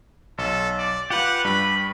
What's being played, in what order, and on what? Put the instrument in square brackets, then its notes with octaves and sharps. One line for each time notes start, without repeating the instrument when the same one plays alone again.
[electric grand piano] B1 [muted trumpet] A4
[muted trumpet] D5
[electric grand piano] F4 [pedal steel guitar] G4 B4 [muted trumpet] F#5
[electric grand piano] G2 [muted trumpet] B5